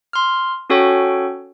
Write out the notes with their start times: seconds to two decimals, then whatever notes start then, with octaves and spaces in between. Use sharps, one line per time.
0.13 C6 F6
0.70 C#4 F#4 A4 C#5 G5 C#6